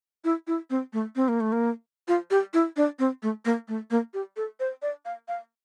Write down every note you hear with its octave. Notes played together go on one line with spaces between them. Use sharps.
E4
E4
C4
A3
C4
A#3
A3
A#3
F4
G4
E4
D4
C4
A3
A#3
A3
A#3
G4
A4
C5
D5
F5
F5